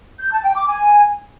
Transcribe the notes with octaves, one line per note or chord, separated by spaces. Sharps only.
G6
A5
G5
D6
G#5